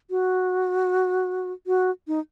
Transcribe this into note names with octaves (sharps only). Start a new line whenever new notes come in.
F#4
F#4
D#4